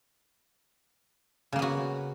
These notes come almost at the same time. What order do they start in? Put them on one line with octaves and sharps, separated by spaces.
C#3 A#3 B3 F#4